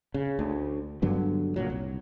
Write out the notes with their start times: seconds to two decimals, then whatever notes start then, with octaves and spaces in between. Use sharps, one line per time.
0.14 C#3
0.39 D2
1.02 G2 D3 F#3 B3
1.56 F#1 C2 A#2 F#3
1.70 C2